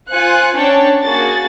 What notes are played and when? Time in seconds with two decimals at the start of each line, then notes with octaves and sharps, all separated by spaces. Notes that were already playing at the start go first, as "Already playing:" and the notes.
0.11 F4 C5 G#5 F#6 C#7
0.56 C#4 D4 C#5 G5 A5
1.02 A#3 F#4 G#4 A6